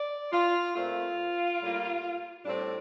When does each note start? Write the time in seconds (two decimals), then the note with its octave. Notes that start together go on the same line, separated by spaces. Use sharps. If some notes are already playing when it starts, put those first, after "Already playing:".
Already playing: D5
0.33 F4
0.75 A#2 A3 C4 F4
1.60 A2 G3 A#3
2.45 A2 G3 C4 D4